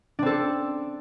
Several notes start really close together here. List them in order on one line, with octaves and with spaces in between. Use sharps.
D4 C4 A4